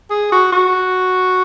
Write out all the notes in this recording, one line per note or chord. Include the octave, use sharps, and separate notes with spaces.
G#4
F#4
F#4